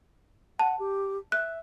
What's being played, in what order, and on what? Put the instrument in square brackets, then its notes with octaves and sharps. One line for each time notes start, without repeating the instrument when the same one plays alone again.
[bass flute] F#5 [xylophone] A5
[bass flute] G4
[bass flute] E5 [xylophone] F#6